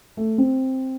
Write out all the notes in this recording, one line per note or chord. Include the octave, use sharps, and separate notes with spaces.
A3
C4